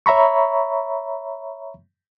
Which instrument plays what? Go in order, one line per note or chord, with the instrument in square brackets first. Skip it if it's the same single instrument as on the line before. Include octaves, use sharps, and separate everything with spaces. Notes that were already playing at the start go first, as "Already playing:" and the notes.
[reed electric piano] C#5 E5 A#5 B5 C#6